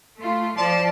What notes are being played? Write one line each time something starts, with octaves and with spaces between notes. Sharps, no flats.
A3 F4
F3 F4 D5 A5